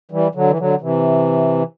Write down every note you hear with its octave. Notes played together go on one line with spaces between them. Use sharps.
E3 G3
D3 F#3
E3
D3 F#3
C3 E3